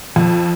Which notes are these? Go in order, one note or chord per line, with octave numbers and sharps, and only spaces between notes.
F2